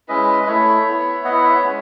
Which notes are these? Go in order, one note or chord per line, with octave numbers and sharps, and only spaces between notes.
G#3 C#4 E4 B4 D#5
A3 E4 C#5 E5
B3 E4
B3 E4 D#5 F#5
C#5 E5
G#3 C#4